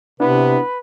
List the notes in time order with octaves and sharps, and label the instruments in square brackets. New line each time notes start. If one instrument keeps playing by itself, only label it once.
[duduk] C3 [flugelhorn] B3 [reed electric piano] D4 E4 [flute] B4